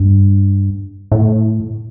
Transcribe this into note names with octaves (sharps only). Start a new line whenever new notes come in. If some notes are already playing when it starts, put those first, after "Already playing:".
Already playing: G2
A2